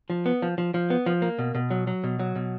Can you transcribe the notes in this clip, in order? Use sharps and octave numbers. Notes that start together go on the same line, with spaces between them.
F3
B3
F3
F3
F3
B3
F3
A#3
B2
B2
F#3
F#3
B2
F#3
B2